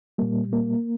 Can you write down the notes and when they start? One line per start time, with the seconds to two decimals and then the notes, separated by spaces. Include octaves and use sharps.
0.18 A#2 G3 A#3
0.53 A#3